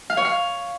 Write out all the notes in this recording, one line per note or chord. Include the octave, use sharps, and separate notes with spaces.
F5
C#5
F5